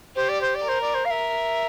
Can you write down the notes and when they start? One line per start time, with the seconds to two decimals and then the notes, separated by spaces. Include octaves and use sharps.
0.15 G4 C5
0.28 D5
0.41 C5
0.54 D5
0.63 A#4
0.68 C5
0.81 D5
0.94 C5
1.04 F5
1.09 A#4 E5